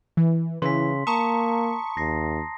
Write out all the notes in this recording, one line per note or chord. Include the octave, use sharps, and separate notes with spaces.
E3
C#3 E3 C6 B6
A#3 A5 A#5 C#6 D#6
D#2 A#6 C7